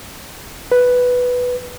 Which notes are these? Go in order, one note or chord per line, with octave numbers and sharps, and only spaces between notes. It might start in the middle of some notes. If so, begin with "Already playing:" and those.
B4